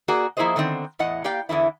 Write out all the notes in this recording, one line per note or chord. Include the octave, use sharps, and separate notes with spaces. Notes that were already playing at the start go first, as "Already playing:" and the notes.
A#3 F#4 G#4 D5
F3 A#3 E4 G#4 C5 D#5
D3 D#3 B3 C4
E2 A2 D#5 F#5
A#3 G4 D5 F5 G5
E2 D3 E3 E4